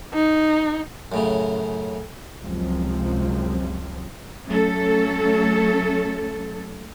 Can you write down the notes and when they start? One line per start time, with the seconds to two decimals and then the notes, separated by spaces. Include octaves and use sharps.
0.14 D#4
1.12 F#2 A2 C#3
2.39 C#2 F#2 C3 F3 G#3 C4
4.47 F#3 A3 C#4 A4